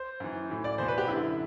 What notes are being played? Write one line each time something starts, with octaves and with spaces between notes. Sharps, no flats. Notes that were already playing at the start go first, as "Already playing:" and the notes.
Already playing: C5
F#2 E3
A2 E3
D5
E2 B2 C5
B4
G4
F#2 D3 E4